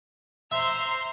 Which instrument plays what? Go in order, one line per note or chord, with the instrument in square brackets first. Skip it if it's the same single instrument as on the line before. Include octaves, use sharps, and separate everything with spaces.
[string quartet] C5 A#5 C6 [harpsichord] E5